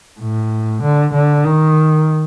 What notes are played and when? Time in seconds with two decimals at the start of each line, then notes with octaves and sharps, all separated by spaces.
0.20 A2
0.82 D3
1.14 D3
1.44 D#3